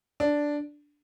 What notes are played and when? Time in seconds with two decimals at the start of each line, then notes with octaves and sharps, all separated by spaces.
0.20 D4